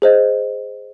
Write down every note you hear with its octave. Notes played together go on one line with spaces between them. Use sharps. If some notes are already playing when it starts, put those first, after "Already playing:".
G#4 C5 D#5